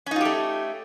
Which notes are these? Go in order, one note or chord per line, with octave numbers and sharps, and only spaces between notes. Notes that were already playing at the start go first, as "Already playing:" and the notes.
A3 C#4 D#4 F4 G4